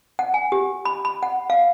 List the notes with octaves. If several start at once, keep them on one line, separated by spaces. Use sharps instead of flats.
F#5
G#5
G4
B5
B5
F#5
F5